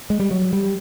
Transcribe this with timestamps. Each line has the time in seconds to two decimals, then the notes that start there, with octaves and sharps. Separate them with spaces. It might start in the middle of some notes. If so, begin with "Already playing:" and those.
0.10 G#3
0.20 G3
0.31 F#3
0.53 G3